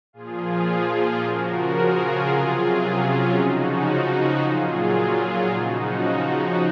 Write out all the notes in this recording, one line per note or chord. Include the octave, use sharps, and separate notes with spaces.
A#2 F3 F4 G#4
C#3 F3 F#4 A#4
F4 G#4
C3 F#3
C#4 F4
C#3 F3 D#4 F#4
A#2 F#3 F4 G#4
F4 G#4
C#3 F3 D#4 F#4